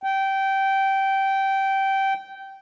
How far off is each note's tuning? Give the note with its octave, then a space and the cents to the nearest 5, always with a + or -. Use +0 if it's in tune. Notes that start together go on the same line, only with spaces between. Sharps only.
G5 -15